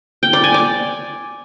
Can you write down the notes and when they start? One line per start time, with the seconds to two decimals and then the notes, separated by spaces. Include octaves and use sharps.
0.23 G5
0.33 D5
0.44 G#5
0.54 D5